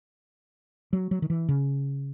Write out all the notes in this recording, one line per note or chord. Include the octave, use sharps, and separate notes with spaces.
F#3
F#3
D#3
E3
C#3